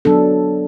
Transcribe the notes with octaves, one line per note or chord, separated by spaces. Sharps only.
F#3 B3 D4 A4